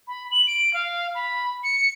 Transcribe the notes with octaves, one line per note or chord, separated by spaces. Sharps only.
B5
F#7
D7
F5
B5
C#7